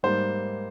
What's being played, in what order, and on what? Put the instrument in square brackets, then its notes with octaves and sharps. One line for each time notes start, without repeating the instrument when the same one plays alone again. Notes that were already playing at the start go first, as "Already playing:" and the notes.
[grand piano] G#2 G3 A#3 C5